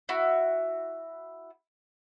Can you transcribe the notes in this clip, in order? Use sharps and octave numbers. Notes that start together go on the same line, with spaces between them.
E4 F#4